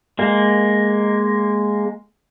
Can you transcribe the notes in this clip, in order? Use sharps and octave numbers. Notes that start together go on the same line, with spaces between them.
G#3 A#3